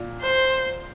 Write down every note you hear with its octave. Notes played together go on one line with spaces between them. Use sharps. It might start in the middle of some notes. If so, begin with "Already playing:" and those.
Already playing: A#2
C5